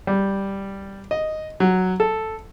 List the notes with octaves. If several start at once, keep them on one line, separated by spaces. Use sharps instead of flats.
G3
D#5
F#3
A4